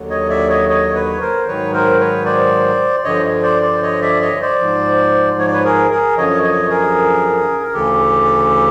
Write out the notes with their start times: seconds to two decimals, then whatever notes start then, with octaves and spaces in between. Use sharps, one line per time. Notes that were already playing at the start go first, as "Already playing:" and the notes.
Already playing: D#2 D3 F#3
0.10 C#5 D#5
0.29 D5 E5
0.49 C#5 D#5
0.69 C#5 D#5
0.94 B4 C#5
1.21 A#4 C5
1.48 G#2 D#3 F#3 B4 C#5
1.73 A#4 C5
2.00 B4 C#5
2.25 C5 D5
3.04 G2 D3 F3 C#5 D#5
3.43 C5 D5
3.62 C5 D5
3.82 C#5 D#5
4.01 D5 E5
4.21 C#5 D#5
4.41 C5 D5
4.61 G#2 F3
5.39 C#5
5.46 D5
5.53 B4 C#5
5.64 G#4 A#4
5.91 G#4 A#4
6.17 F#2 D3 F3 C#5 D#5
6.43 C#5 D#5
6.69 G#4 A#4
7.63 A#4
7.73 D2 C#3 E3 G4 A4